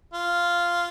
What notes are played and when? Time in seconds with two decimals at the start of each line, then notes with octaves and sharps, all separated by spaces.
0.13 F4